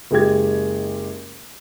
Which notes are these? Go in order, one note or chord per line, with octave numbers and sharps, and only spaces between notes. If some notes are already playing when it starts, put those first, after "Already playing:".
F#1 G#3 G4 G#6